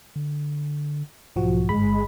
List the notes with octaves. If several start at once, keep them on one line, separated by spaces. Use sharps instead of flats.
D3
B1 G#2 F3 F#4
G1 G#3 B5